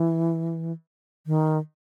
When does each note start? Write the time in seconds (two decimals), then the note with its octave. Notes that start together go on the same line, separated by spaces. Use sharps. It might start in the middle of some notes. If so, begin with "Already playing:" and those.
Already playing: E3
1.27 D#3